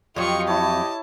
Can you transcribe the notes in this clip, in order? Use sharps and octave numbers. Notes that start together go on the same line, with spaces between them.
F2 F#3 F4 G4 D#5 C#6
E4 C#5 A5